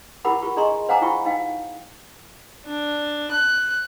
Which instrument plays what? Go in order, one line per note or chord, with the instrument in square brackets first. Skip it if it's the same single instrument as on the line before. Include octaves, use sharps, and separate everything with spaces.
[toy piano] E4 G4 A#4 F#5 B5 D6
F4 G4 A#4 C#6
D4 G#4 D#5 A#5 C6 C#6
C5 F5 F#5 G#5 A#5 D6
E4 F4 G5 C#6
D#4 F5 G5
[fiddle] D4
F#6